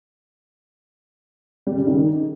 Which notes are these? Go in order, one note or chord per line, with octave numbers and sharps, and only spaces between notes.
G3
C#3
D#3